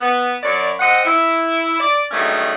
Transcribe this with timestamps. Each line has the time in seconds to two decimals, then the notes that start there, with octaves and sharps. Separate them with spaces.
0.01 B3
0.43 F#2 C#5 D5
0.80 C4 D#5 F#5
1.05 E4
1.80 D5
2.11 G2 D#3 F#3 G#3 A3 C#4